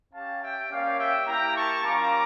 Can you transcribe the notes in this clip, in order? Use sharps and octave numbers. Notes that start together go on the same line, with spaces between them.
C#4 G4 F5 A5
E5 G5
A#3 C#4 G4 D5 F5
E5 G5
A#3 E4 G4 G5 A#5
A5 C#6
G3 A#3 C#4 F4 A#5 D6